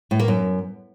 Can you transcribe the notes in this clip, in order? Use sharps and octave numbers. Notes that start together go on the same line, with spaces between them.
A2
A#3
F#2